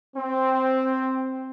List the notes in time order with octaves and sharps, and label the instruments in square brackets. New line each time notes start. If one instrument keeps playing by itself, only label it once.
[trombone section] C4